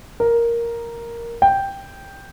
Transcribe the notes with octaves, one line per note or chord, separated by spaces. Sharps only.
A#4
G5